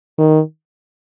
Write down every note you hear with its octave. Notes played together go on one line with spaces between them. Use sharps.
D#3